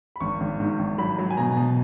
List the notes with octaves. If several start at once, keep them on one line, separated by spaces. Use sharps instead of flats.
B5
G#1 C#6
G#1
G#2
G#1
F#3 B5
F#3
G#5
B2 A#5
B2